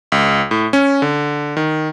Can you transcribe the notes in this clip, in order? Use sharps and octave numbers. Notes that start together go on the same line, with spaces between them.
C#2
A2
C#4
D3
D#3